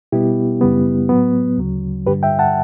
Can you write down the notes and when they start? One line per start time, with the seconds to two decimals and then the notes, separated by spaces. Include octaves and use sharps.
0.12 B2 G3 B3 E4 G4
0.61 F#2 C#3 G3 B3
1.09 A2 F#3 B3
1.58 D2 C#3 F#3
2.06 G2 D3 G3 G4 B4
2.23 E5 G5
2.39 F#5 A5